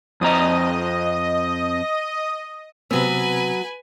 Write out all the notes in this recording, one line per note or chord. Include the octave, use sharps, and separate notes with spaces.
F2 C4 D#5 A#5 D#6
C3 F#3 B3 C4 B4 G#5 E6